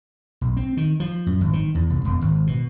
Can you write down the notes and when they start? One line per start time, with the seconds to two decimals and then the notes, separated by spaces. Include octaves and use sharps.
0.41 B1
0.57 C4
0.77 D#3
1.00 F3
1.26 F#2
1.41 G#1
1.53 D#3
1.75 E2
1.90 C2
2.05 E1
2.22 G#1
2.47 B2